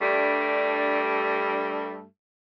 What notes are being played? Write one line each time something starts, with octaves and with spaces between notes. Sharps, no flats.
G2 G3 A3 D4